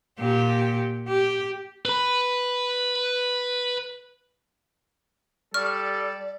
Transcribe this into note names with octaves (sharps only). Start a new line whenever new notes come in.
A#2 G4
G4
B4 B5
G3 A4 D5 C#6 F6